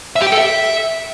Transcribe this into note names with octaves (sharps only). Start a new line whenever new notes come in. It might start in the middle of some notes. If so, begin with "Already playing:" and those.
E5
G4
G5
A4
E5